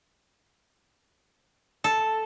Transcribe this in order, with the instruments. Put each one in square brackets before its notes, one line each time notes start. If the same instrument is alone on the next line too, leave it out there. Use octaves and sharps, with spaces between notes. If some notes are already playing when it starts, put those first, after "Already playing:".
[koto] A4